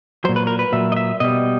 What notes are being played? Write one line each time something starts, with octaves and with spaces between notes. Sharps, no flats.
A#2 F#3 C5
B4
A#4
B4
A#2 F#3 E5
D#5
E5
B2 G3 D#5